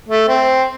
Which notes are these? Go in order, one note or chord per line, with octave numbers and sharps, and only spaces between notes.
A3
C4